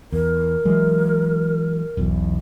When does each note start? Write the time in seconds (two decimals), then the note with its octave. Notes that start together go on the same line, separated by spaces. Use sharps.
0.12 E2 A#4
0.65 E3 F#3 G#3
1.97 E1 B1 E2